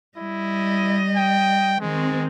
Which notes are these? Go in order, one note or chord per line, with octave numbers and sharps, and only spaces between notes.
G3 E4 D#5
G5
D#3 G#3 C4